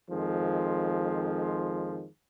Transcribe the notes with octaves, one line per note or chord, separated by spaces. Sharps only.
F2 D#3 F3 G#3